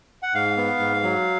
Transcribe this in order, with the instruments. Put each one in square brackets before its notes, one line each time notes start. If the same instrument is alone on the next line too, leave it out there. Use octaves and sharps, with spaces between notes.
[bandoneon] F#5
G#2 F5
B3
G#2
F#3